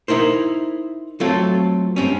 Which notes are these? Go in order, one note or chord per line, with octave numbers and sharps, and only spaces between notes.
D#4 E4 A#4 C5
F#3 A3 C4 F4 A4
G2 C4 C#4